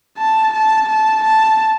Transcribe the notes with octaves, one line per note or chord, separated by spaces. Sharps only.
A5
A5
A5
A5